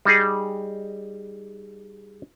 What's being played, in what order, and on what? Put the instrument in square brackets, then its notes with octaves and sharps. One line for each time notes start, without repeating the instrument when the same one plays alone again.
[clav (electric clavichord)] G3 D#4 G#4